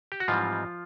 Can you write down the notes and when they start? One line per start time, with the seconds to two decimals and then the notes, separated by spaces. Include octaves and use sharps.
0.12 G4
0.20 F#4
0.28 G#2 E3 F3 G3 C4 F4